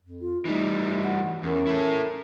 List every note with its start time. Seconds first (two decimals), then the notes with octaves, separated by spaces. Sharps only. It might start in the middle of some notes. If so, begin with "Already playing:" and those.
0.02 F2
0.21 F4
0.45 E3 G3 A3 D#4
1.04 F#5
1.43 E2 C#4 A#4
1.67 E4 A4